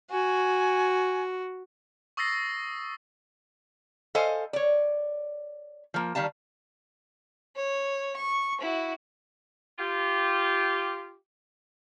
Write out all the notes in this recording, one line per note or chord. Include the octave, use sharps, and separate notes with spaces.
F#4 G#5
C#6 D#6 E6 A6 A#6 C7
A4 C5 D#5 F5 G#5
C#5 D5
F3 A#3
D#3 G3 F5 A5
C#5
C#6
E4 F#4
F4 G4